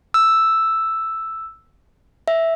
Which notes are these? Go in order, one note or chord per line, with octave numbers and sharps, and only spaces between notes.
E6
E5